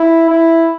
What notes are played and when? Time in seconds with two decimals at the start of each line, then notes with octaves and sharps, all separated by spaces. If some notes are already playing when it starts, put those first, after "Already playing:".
Already playing: E4
0.30 E4